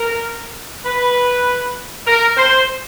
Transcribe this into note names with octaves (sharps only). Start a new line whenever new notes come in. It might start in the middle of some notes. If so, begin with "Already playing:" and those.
Already playing: A#4
B4
A#4
C5